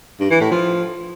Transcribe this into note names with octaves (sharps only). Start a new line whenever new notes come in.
G2
E3
A2
F3